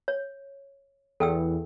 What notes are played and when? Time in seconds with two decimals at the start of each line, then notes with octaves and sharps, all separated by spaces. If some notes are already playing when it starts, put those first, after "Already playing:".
0.08 C#5
1.20 E2 A4 G5 E6